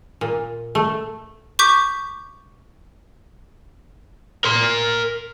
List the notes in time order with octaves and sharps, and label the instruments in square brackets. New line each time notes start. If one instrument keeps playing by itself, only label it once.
[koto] A#2
A3
[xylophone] C#6 D6 G6 B6
[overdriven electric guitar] A#4 C6